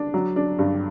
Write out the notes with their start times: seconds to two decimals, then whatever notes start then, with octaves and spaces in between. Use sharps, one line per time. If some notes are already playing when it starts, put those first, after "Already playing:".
Already playing: D4
0.14 F#3
0.36 D4
0.59 G2